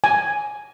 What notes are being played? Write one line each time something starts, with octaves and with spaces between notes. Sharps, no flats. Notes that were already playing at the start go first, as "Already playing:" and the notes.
G#5